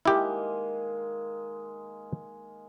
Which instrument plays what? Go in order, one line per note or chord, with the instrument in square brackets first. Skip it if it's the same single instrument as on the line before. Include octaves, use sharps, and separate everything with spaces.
[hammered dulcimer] D#3 G#3 A#3 [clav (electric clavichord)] E4 G4